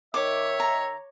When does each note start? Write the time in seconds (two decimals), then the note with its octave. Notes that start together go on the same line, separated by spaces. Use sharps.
0.14 D#3 C#5 E5 D6
0.60 A#5